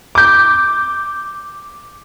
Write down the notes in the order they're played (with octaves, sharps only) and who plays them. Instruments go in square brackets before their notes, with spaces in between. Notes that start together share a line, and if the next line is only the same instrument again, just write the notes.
[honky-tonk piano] D6 G6